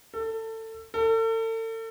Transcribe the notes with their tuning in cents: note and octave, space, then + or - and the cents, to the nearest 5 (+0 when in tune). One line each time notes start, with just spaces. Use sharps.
A4 +25
A4 +40